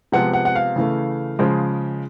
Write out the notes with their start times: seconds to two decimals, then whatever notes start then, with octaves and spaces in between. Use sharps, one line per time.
0.12 C3 F3 G#3 B3 F#5
0.33 F#5
0.45 F#5
0.55 F5
0.76 C#3 E3 A3
1.39 C#3 F3 G#3